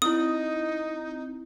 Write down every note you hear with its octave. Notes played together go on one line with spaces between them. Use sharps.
C4 D#4 E4 D#6